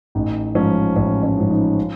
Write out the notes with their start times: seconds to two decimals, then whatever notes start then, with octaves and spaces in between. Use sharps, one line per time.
0.15 A1 D#4
0.55 G#2 F3 C#4
0.96 A1 C#4
1.23 C#4
1.37 G#2 F3
1.51 D#4
1.78 F4